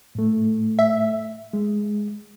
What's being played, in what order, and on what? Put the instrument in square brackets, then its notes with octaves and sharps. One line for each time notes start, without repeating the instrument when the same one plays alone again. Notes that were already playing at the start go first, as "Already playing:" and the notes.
[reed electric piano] A2 A3
[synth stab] E5
[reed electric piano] G#3